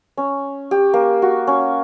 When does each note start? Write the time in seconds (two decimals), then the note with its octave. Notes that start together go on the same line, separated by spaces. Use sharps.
0.17 C#4
0.71 G4
0.94 A#3
1.22 F#4
1.47 C#4